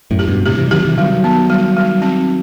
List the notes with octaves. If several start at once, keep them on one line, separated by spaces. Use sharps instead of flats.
F#2 A2
G4
G2 B2
A2 C3 G4
C3 E3
G3
D#3 F#3 G4
C3 E3
D#3 F#3 G3
B3
G3
G3
C4